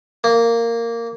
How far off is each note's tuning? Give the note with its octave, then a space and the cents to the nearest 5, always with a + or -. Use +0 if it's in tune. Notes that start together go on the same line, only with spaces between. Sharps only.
A#3 -10